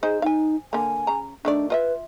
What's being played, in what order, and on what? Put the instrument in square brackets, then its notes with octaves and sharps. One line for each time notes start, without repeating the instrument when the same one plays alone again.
[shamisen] D#4 C5 G#5 [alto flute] G#4
[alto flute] D#4 [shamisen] F5 G#5
[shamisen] D3 A#3 [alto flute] G#5
[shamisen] C#3 A#5
[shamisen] D#3 A3 D5 [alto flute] D4
[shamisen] F4 D#5 E5 [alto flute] B4